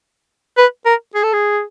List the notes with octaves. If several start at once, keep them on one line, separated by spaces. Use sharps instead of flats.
B4
A#4
G#4
A4
G#4